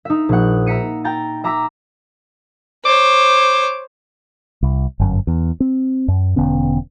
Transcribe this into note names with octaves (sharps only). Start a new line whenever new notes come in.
D#4 E5
A#1 F#5
E5 A#5 B6 C#7 D#7
G5 A#5 A6
E5 A#5 D6 E6 A#6 B6
C5 C#5 D6
C2
G1 F#2
E2
C4
F#2
E1 D3 B3 C#4